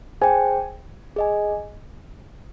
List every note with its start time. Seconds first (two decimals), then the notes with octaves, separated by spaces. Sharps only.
0.21 G#4 C5 G5 G#5
1.16 G#4 D#5 G#5